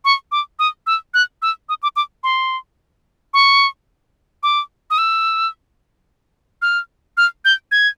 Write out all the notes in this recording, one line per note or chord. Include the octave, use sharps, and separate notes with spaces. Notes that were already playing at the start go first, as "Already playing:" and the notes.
C#6
D6
D#6
E6
F#6
E6
D#6
D6
D6
C6
C#6
D6
D#6
E6
F6
F6
G6
G#6